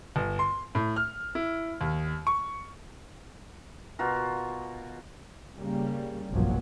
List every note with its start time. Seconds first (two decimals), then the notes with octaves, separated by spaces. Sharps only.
0.16 G1
0.39 C6
0.75 A2
0.96 F6
1.35 E4
1.81 D#2
2.27 C#6
3.99 B2 F4 F#4 A#4
5.58 C#3 G3 A#3
6.31 F1 B1 G2 A#2 F3 F#3